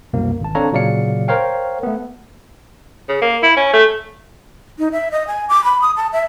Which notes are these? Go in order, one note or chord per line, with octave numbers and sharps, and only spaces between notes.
C2 F#2 B2 A#3
G#1 A5
C4 D4 A4 C#5 F5 A#5
A#2 C#3 F#3 D5 F5 C#7
A#4 C5 C#5 F5 G5
A3 B3
C#3
A#3
E4
C#4
A3
D#4
E5
D#5
G#5
D6
B5
D#6
A5
E5